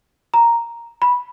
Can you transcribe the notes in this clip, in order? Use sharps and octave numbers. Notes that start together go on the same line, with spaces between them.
A#5
B5